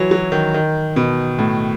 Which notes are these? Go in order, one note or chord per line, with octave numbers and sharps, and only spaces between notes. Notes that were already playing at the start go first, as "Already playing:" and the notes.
Already playing: E3 F#3
F#3
D#3
D#3
B2
A2